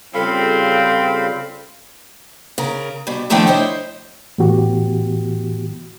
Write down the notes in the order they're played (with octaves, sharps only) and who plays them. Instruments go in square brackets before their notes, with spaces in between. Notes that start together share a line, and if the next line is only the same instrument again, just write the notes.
[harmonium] C#3 G3 F4 [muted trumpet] C4 [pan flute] A4 [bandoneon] F5 B5
[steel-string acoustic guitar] C#3 A#4
G2 B2
D#3 F3 A3 D4 E4 G5
E4 C5 C#5 D#5
[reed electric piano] A2 E3 B3 F#4 G4